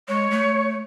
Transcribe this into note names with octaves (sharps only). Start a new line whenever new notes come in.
G#3 C#5
A3